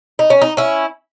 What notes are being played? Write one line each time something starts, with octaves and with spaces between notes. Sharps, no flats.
D#4
C#4
D#4
C#4 E4